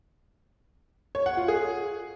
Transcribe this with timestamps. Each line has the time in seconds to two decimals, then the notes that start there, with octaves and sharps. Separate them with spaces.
1.15 C#5
1.26 F#5
1.37 F4
1.48 G#4